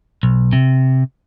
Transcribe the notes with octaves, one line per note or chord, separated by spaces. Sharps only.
B1
C3